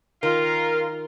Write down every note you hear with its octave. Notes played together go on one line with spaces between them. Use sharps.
D#3 F4 A#4